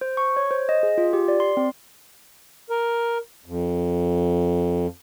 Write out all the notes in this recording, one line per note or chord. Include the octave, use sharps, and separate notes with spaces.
C5
C#6
C#5
C5
D#5
G#4
F4
G4
D5
C6
C4
A#4
F2